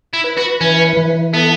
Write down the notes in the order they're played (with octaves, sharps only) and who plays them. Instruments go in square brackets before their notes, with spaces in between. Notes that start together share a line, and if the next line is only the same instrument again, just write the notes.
[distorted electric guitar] E4
[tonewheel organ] B4
[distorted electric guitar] F#4
[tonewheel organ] E3 [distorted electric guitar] C#4
[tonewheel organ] E3
[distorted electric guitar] B3 [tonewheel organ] A4